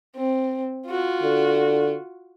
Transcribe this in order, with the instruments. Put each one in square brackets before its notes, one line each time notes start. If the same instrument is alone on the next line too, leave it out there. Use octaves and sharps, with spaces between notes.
[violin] C4
F4 F#4
[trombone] D3